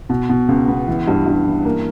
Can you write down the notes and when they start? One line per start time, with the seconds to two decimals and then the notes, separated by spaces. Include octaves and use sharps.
0.09 B2
0.29 B2
0.48 C#2
0.68 B3
0.87 E3
1.07 G2
1.26 G2
1.46 E3
1.65 A#3